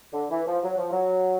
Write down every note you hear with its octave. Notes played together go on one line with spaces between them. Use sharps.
D3
E3
F3
F#3
F3
F#3